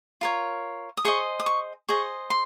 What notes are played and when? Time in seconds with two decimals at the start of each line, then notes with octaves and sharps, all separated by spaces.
0.21 F4 A#4 C#5
0.97 D#6
1.05 G#4 C5 D#5 C#6
1.40 D#6
1.46 C#6
1.89 G#4 C5 D#5 C#6
2.30 C6